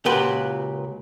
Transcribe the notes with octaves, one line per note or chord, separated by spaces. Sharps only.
C#2 A#2 F#4 G4 B4 C6